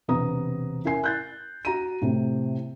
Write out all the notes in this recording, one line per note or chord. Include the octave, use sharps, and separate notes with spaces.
E1 C3 B3 A#5 D#6
C#4 E4 A#4 G#5 C7
F#6 G6 A6
F#4 A#5 D#7
A2 C3